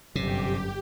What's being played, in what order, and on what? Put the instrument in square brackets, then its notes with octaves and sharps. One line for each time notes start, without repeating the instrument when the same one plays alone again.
[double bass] G1 [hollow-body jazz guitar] F#2 [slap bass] C3 [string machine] G4